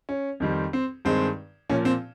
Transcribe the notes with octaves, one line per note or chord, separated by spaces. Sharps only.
C#4
F2 D#3 G3 C4
C4
G2 D#3 G#3 C4
A#2 F3 A#3 C#4
C4